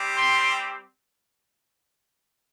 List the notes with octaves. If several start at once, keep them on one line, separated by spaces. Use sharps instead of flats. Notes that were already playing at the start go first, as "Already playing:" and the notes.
Already playing: G3 C4 G4
G5 C6